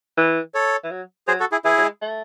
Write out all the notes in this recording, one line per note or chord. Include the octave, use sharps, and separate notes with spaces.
E3
A4 C#5
E3
F#3
F#3 G#4 C5
F#4 A4
E4 G#4
E3 E4 G#4
F#3
G#3
A3